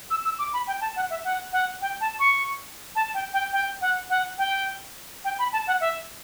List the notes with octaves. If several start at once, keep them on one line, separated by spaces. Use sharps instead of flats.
E6
E6
D6
B5
G5
A5
F#5
E5
F#5
F#5
G5
A5
C#6
A5
G5
G5
G5
F#5
F#5
G5
G5
B5
A5
F#5
E5